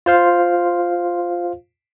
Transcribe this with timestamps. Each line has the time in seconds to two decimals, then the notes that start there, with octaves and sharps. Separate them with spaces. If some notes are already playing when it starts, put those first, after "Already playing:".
0.06 F4 C5 F5